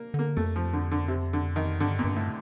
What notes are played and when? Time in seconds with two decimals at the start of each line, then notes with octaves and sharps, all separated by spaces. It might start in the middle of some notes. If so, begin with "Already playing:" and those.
Already playing: A#3
0.14 D3 A#3
0.37 F2 A3
0.56 F3
0.73 D3
0.91 D3
1.08 C3
1.33 D3
1.56 D#3
1.80 G2 D3
1.99 A#2
2.04 G2
2.16 A2